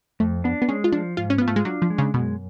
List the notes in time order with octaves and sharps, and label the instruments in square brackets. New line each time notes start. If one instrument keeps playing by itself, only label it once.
[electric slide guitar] F2 [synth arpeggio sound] A3
[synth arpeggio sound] B3 [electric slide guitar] D4
[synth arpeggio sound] B3
[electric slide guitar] G#3 [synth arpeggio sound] C#4
[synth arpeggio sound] F4
[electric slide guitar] F3 [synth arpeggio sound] D4
[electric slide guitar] G#2 [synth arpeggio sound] F4
[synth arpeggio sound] C#4
[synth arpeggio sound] B3 [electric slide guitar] F4
[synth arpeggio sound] A3
G#3
[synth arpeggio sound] F#3 [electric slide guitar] D4
[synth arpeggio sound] F3
[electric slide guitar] G#3
[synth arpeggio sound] C#3
[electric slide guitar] F#2 [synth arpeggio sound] B2